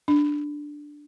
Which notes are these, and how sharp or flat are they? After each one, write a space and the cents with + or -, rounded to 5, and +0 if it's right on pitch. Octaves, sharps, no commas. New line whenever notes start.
D4 +5